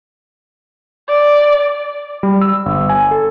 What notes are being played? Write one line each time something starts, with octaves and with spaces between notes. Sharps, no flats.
D5
G3
E6
G1
G#5
A4